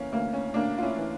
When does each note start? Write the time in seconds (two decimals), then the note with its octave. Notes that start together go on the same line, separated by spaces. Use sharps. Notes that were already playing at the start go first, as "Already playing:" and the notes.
Already playing: E3 A#3 C#4
0.12 D2 A#3
0.33 C#4
0.54 D2 A#3 D4
0.78 F4
0.82 C#4 E4
0.97 E3